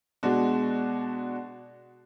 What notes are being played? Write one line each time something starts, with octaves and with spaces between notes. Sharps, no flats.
B2 G#3 D4 F#4